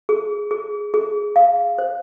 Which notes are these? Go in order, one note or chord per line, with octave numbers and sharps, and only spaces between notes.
G#4
G#4
G#4
F5
C5